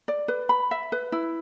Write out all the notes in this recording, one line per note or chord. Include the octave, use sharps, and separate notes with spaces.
D5
B4
B5
E5
B4
E4